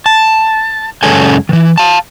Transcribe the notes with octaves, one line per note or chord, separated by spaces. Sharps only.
A5
F#2 C#3 G#3 C#4 A4 G#5
D#3 E3
F5 A5